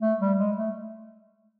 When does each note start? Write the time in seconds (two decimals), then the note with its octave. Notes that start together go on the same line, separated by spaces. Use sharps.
0.01 A3
0.20 G3
0.38 G#3
0.57 A3